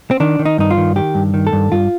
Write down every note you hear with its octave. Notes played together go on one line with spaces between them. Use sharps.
C4
D#3 D4
D#3
D#4
G2 D#4
F4
D#3
D#3 G4
G2
D#3
A4
G2
G2 F4